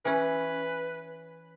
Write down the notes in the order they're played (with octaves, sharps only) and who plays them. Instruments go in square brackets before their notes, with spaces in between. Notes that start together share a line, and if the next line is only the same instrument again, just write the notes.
[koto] E3 C#4 [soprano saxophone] B4